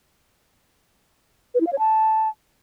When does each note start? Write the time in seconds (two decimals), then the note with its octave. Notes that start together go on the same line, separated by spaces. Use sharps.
1.54 B4
1.60 E4
1.67 F5
1.73 C#5
1.79 A5